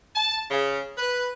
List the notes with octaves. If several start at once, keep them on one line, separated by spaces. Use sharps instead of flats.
A5
C#3
B4